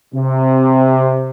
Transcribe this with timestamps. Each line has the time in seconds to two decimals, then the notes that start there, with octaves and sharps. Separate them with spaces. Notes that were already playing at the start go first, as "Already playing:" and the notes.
0.14 C3